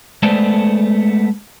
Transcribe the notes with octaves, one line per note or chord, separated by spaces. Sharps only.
G#3 A3 B3 A4 C5 D5